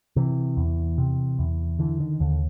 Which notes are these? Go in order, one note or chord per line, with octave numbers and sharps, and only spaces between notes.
C3 E3
E2
C3
E2
D3 E3
D#3
D#2 D3